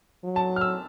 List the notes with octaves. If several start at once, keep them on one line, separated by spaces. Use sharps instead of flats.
F#3
A5
F6
E6